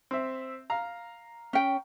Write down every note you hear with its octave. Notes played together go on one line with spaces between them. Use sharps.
C4 E5
F5 A#5
C#4 G5